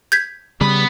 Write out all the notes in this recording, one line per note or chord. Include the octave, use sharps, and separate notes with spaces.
G6 G#6 B6
C#3 G3 B3 B5